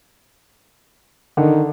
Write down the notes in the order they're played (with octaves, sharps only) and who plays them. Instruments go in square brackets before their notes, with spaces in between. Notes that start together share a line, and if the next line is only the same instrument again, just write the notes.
[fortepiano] D3 [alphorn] D#3